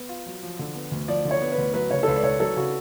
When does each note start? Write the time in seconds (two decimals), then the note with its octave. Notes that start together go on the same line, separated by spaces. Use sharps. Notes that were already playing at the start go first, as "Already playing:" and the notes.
Already playing: B3
0.09 F4
0.26 F#3
0.43 F3
0.59 D3
0.75 B3
0.91 D2
1.08 F3 D5
1.25 D3
1.31 C#5
1.42 B3
1.52 B4
1.58 D2
1.74 F#3 B4
1.91 C#3 C#5
2.03 A4
2.07 C#2 B4
2.16 D5
2.23 C#2 C#5
2.40 F#3 A4
2.56 C#3 F#4